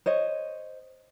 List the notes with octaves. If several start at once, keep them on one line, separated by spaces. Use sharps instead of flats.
C5 C#5 D#5